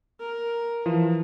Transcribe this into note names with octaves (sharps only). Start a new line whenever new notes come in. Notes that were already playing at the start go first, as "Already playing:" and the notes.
A#4
E3 F3